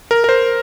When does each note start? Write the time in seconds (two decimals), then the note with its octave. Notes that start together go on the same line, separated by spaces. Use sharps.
0.11 A#4
0.24 A#4
0.29 C5